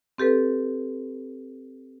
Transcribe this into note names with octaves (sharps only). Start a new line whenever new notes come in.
C4 G4 A4 B4